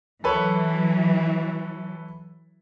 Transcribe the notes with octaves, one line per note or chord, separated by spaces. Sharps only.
E3 F#3 A4 B4 C#5